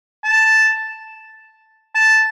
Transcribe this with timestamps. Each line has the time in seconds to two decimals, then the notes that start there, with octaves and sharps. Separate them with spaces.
0.24 A5
1.95 A5